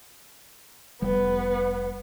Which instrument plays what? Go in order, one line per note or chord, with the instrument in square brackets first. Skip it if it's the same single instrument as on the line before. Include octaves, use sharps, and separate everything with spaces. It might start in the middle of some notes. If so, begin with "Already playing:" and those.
[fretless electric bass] F1 G3 [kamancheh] B3